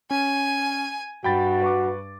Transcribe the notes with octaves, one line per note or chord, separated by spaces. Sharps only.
C#4 G#5
G2 F#4 G5 B5 A6
B4 C#6 D6